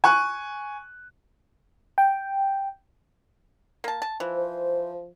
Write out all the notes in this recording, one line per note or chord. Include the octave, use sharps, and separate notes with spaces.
G#5 C#6 F#6
G5
A#3 A5
A5
E3 F3
C5